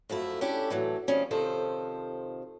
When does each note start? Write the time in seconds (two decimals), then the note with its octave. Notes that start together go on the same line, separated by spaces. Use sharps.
0.09 F#2 F3 A3 E4
0.41 C#4 D4 E4 G4 A4
0.70 A2 E3 F#3
1.08 D#3 F3 G3 C#4
1.31 C3 D#3 F3 A4 C5